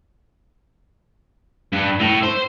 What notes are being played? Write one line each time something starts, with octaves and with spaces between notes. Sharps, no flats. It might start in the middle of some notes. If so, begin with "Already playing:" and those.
G2
A2
C5